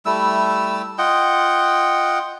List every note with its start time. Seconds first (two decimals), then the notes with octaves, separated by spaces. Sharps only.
0.06 G3 A3 E4 E6
0.98 F4 D#5 F#5 G5